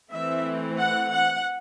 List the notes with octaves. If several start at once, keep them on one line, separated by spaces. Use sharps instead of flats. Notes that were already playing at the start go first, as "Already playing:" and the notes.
E3 A3 C4 E5
F#5
F#5